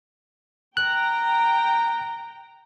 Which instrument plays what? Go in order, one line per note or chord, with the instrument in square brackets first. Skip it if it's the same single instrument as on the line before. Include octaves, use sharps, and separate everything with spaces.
[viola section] G5 A#5 [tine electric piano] F#6